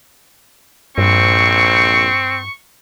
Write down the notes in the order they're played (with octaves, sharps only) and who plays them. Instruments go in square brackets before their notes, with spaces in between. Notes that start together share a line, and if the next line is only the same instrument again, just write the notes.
[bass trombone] A#1 [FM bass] G2 [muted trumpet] C4 [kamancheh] C#6